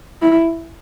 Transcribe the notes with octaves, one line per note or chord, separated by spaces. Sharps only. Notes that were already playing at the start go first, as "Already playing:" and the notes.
E4